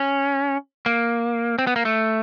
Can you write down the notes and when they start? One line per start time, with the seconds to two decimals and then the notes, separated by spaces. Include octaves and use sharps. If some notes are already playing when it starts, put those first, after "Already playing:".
Already playing: C#4
0.86 A#3
1.59 C4
1.67 B3
1.76 A#3
1.85 A3